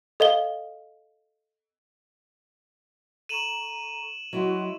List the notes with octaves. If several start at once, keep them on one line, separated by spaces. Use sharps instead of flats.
A4 D#5 F5 G7
A4 A#5 C#6 D#7 E7 F#7
F#3 E4 F#4 D#5 C6